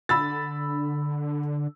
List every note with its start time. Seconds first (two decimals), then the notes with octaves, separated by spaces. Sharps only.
0.09 D3 B5 E6 A6